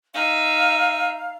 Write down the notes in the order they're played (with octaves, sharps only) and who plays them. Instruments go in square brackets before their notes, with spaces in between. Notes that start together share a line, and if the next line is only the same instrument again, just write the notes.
[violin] D#4 E5 [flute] F5